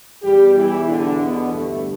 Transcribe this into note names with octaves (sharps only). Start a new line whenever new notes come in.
E2 B2 G3 G4
E3 E4
D3 D4
B2 B3
G2 D3 A3